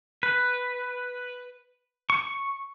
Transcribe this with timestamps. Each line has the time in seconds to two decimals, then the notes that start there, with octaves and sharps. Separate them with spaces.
0.23 B4
2.10 C#6